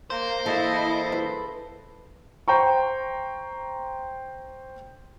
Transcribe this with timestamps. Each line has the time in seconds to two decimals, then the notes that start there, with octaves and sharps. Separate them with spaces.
0.10 A#3 C5
0.46 E3 A#3 E4 A4 D#5
1.12 B4
2.48 C5 G5 A#5 C#6